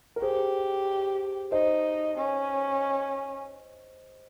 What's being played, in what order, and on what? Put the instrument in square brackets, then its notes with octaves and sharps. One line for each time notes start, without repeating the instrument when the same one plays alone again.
[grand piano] A#4
[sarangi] G4 [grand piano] G#4 C5
[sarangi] D#4 [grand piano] C5 D#5
[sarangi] C#4